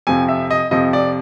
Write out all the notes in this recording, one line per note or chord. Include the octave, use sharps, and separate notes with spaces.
F2 C3 F3 G#5
E5
D#5
F2 C3 F3 D#5
D5